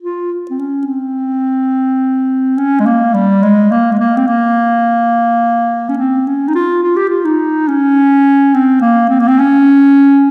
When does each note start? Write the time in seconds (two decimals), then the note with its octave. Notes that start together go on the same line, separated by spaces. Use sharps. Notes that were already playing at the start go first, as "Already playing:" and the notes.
0.02 F4
0.50 C4
0.59 C#4
0.87 C4
2.57 C#4
2.80 G#3
2.86 A#3
3.14 G3
3.43 G#3
3.71 A#3
3.92 G#3
3.99 A#3
4.17 C4
4.27 A#3
5.89 C#4
5.97 C4
6.26 C#4
6.48 D#4
6.55 F4
6.83 F4
6.96 G4
7.09 F4
7.25 D#4
7.68 C#4
8.54 C4
8.81 A#3
9.09 C4
9.20 A#3
9.28 C4
9.39 C#4